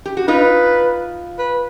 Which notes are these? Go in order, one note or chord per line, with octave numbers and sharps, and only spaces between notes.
G4
F#4
D#4 F4 B4
B4